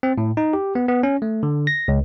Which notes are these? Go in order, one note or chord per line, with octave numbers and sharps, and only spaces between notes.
C4
A2
D#4
G4
B3
B3
C#4
A3
D3
A#6
C#2